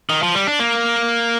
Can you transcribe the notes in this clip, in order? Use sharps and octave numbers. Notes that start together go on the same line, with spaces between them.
D#3
F3
G3
D4
A#3